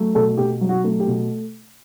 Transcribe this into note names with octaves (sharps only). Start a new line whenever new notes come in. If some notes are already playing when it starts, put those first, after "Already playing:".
Already playing: F#3 A3
B2 A4
B2 G4
F#3
F#4
A3
G4
B2